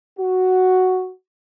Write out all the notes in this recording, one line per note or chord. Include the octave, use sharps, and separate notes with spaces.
F#4